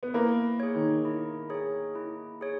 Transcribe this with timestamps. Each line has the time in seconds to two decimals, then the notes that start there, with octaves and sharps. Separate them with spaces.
0.03 B3
0.14 A#3 E4
0.60 G#4 C#5
0.75 D#3
1.05 E4
1.50 G#4 C#5
1.95 E4
2.41 G#4 C#5